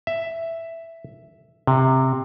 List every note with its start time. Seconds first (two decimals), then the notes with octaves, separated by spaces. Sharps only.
0.07 E5
1.67 C3